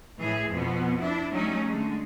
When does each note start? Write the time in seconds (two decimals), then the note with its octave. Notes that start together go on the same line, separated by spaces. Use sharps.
0.19 A2 E3 G#4
0.50 F2 B2 B3
0.99 D4 E4
1.32 F#3 G3 A3 C#4 D#4
1.68 D3 G#3 A3